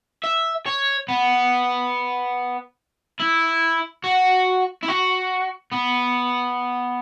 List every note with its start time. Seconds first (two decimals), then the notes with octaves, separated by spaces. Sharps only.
0.24 E5
0.66 C#5
1.08 B3
3.20 E4
4.04 F#4
4.83 E4
4.88 F#4
5.72 B3